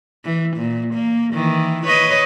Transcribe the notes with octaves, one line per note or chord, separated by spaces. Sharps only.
E3
A#2
A#3
D#3 E3
B4 C#5 D#5